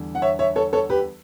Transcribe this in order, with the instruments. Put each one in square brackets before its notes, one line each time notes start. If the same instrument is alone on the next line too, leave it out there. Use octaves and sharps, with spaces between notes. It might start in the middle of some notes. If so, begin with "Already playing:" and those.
Already playing: [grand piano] E2 D3 G3
F#5
C#5 E5
C#5 E5
A4 C#5
A4 C#5
G4 B4